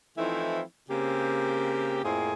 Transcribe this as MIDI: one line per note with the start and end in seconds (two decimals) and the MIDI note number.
0.18 0.61 52
0.18 0.61 53
0.18 0.61 57
0.18 0.61 60
0.18 0.61 63
0.18 0.61 64
0.90 2.01 49
0.90 2.01 58
0.90 2.01 60
0.90 2.01 67
2.04 2.33 41
2.04 2.33 45
2.04 2.33 58
2.04 2.33 60
2.04 2.33 64
2.04 2.33 68